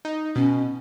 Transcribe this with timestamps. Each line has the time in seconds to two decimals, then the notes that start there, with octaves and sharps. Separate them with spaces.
0.05 D#4
0.36 B2 C#4